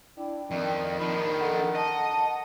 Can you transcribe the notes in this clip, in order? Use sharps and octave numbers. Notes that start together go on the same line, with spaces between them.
D4 E4 G5
F2 D#3 D5
F3 D4 D#4 B5
A4 F#5
D#5 A5